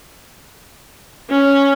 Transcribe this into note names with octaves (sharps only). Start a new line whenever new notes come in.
C#4